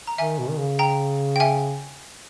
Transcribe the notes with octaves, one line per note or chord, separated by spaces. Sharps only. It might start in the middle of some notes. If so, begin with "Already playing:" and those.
A#5
D#3 E5 G#5
B2
D#3
C#3
G5 A#5
G5
E5 G#5